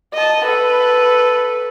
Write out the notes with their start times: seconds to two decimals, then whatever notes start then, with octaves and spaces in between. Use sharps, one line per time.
0.14 D#5 A5
0.45 A4 B4